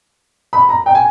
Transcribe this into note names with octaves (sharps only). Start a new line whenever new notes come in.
B5
A#5
G5
G#5